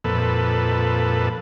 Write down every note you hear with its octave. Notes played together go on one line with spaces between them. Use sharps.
F2 A#2 A4 B4